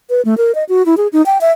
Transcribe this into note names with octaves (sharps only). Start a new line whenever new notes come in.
B4
A3
A#4
D#5
F#4
E4
G#4
D#4
G5
E5